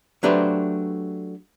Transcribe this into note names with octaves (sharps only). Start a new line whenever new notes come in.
F#3 A3 D4 G4 B4 C5